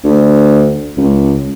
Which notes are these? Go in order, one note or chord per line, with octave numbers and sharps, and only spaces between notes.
D2
C#2